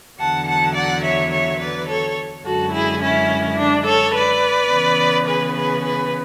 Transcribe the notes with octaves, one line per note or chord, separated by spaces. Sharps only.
E2 D3 F#3 F#5 A5
F#5 A5
D5 F#5
C#5 E5
C#5 E5
B4 D5
A4 C#5
F#2 D3 G#3 F#4 A4
E4 G#4
C#4 E4
D4
A4 C#5
B4 D5
C#3 E3 B3
G#4 B4
G#4 B4
G#4 B4